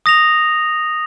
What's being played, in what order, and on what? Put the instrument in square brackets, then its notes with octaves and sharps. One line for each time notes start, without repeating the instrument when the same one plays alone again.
[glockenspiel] D#6 A#6 F7